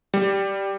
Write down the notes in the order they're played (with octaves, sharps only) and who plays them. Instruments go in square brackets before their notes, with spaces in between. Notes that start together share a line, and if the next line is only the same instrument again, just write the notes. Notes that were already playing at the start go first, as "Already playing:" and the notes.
[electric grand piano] G3